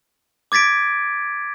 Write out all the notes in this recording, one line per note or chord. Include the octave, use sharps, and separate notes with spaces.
D6 G#6 A6 B6 D7